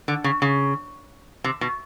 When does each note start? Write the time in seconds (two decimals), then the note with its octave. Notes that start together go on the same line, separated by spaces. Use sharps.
0.08 D3
0.24 C#3
0.42 C#3
1.44 C3
1.61 B2